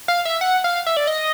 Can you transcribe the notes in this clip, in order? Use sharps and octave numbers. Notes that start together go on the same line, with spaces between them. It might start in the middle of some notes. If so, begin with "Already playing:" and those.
F5
E5
F#5
F5
E5
D5
D#5